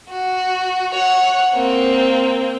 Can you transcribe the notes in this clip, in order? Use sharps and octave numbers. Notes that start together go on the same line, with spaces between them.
F#4
C#5 F#5
A#3 C4